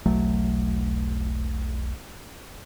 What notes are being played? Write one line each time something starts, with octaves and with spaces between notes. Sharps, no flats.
E1 B1 F#3 A3